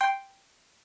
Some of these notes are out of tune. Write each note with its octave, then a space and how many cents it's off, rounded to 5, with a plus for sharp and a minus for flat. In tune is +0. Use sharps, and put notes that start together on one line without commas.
G5 +0 C6 +0